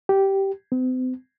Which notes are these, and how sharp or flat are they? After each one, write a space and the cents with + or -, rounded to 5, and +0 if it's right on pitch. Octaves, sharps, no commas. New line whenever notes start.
G4 -10
C4 -40